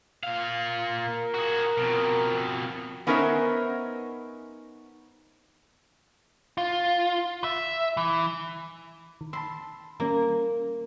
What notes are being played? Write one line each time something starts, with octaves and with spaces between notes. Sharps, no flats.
A#2 F5
A#4
F#4 G#4
F2 B2
B3 C#4 D#4 A#4 C5 E5
F4
E5
E3
D#3
A5 B5 C6 E6
D#3 G3 A#3 C#4